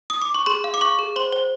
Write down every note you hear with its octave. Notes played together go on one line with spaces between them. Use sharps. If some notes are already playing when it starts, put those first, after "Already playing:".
D#6
D6
C#6
G#4 C6
F5
D6
F5 C#6
G#4
C5 C6
C5